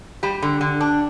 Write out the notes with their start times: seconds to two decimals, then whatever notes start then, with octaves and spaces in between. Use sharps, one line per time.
0.23 G3 G4
0.43 D3
0.61 D3
0.81 D4